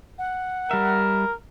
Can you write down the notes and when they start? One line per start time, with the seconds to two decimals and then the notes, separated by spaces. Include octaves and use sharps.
0.18 F#5
0.71 G3 A#4 E5